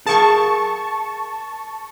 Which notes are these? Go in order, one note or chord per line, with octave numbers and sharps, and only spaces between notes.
G#4 A#4 F5 A5 C#6